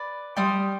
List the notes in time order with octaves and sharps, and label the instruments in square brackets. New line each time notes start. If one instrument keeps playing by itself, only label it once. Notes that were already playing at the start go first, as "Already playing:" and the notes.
Already playing: [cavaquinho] B4 D5
[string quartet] G3 [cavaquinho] D5 G5 C6 D#6